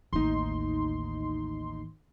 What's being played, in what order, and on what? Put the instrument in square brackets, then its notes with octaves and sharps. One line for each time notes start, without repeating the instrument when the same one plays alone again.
[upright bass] A1 D#2 [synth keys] D#4 C6